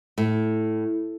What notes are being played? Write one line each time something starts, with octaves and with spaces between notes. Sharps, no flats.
A2